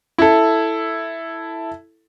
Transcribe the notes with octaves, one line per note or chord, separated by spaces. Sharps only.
E4 A4